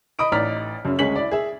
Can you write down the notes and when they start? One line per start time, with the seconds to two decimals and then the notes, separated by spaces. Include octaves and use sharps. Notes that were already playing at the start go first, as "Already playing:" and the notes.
0.19 D#5 B5 D#6 D7
0.32 A1 D#4 D5 A#5 F6 B6
0.85 F#2 C#3
0.99 D2 G#3 C#4 G#4 B6 F#7
1.16 E4 D5
1.31 G#4 E5